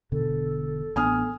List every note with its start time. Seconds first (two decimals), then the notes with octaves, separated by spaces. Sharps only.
0.12 E1 B2 D3 A4
0.96 A1 B3 D4 G#5 D#6 F6